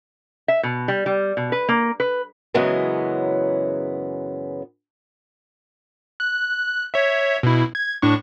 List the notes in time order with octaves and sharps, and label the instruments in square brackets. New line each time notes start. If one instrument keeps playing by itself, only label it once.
[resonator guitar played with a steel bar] E5
B2
G3
G3
B2
B4
A#3
B4
[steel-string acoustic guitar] F#2 C#3 E3 F#3 G#3 B3
[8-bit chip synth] F#6
C#5 E5
B2 E4
G#6
A2 D4 C#6